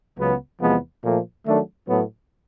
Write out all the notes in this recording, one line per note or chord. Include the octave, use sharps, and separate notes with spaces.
C#2 C#3 F#3 B3
E2 C3 F3 G#3 B3
A#2 F3 A3
D#3 F#3 A3 D4
A2 F#3 B3